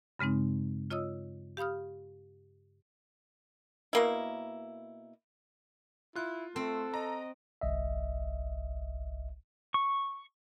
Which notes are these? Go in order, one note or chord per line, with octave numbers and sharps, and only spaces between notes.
G2 C#3 G#3 C4 D#4
F4 C#5 D#5 D#6 E6
G4 F5 B5 D#6 F6
B2 A#3 E4
E4 F4 F#6
A3 C4 A4
D#5 A#5
G1 C2 D#5 E5
C#6